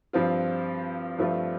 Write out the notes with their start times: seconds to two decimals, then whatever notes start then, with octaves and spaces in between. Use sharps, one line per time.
0.13 G2 F3 C4 F4
1.18 G2 F3 A3 C4 F4